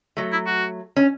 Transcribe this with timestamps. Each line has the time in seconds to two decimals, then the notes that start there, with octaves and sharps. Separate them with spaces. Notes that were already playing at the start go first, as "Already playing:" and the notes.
0.17 F#3 A3
0.32 E4
0.47 F#4
0.96 C#4